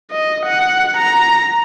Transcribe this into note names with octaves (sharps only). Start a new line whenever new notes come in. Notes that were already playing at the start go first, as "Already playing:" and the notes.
D#5
F#5
A#5